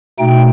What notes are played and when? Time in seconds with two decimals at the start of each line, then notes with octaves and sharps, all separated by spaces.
0.18 B2 A3 D#4 G5